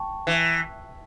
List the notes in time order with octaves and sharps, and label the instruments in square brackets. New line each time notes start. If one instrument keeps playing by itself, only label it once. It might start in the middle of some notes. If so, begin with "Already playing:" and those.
Already playing: [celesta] G5 A5 C#6
[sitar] E3